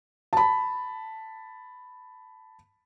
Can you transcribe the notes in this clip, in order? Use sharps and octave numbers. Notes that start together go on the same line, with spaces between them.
A5 B5